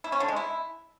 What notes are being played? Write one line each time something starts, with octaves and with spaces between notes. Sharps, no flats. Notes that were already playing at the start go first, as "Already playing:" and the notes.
E4
C#4
D3
G#3
E4